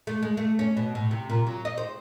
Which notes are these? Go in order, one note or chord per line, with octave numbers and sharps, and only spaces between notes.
A3
G#3
A3
C#4
B2
A2
C3
A#2
F#3
D#5
C5